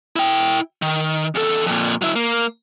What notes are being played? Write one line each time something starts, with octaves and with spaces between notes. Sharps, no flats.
E4 G5
D#3
E2 A4
F2 A#2
F#3 E4
A#3